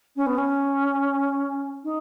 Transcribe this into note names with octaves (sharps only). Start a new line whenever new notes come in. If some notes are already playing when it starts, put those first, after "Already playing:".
C#4
B3
C#4
D#4